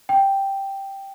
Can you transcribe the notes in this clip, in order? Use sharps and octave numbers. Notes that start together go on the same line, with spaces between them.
G5